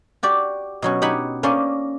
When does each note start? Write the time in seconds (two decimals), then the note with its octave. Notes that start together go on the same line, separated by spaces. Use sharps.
0.23 F#4 G4 D5
0.82 B2 F#3 C#4
1.02 D#4 G4 F#5 G#5 B5
1.43 A#3 C#4 C5 D5 D#5 C6